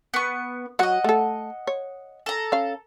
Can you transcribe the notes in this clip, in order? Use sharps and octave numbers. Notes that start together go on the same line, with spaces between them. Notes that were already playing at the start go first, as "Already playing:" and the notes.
B3 C#6
F#3 F#4 D#5 F#5
A3 A4
C#5
A4 A#5
C#4 F5